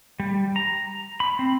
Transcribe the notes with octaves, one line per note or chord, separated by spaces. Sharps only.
G3
A#5
B5
C4